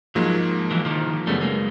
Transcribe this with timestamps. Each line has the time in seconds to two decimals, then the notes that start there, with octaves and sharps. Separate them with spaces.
0.15 G#2 F3 F#3 G#3 A#3
0.71 E3 F#3
0.85 D#3 F3
1.27 F#2 C#3 F#3 G3 A3 B3
1.41 G#3 A#3